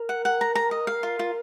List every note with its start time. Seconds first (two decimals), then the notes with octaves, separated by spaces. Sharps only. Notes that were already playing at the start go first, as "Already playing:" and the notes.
Already playing: A#4
0.09 F#5
0.25 F#5
0.41 A#5
0.55 A#5
0.71 D#5
0.87 F5
1.03 F4
1.19 F4